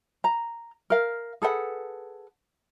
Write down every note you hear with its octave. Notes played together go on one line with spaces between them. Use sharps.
A#5
A#4 F5
G#4 A4 B4 F#5